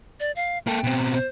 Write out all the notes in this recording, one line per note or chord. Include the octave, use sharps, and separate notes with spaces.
D5
F5
A#3 A4 G5
B2 C4
C5